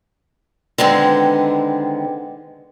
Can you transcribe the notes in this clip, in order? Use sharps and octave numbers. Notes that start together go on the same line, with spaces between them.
D3 D#3 G#3 B3 C4